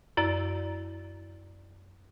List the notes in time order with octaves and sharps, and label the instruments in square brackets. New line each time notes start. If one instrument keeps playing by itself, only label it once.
[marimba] F#2 E4 D5 A#5 A6